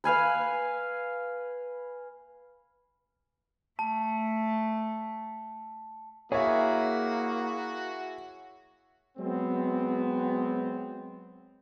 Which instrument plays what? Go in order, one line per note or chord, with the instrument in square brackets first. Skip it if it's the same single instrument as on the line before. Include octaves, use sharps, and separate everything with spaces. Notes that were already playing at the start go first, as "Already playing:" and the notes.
[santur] B4 F5 G#5 B5
[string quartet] A3 [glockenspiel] A5
[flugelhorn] A#3 [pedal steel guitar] E4 G#4 [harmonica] F#4 [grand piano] C#5 E5
[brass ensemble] F#3 G#3 B3 C4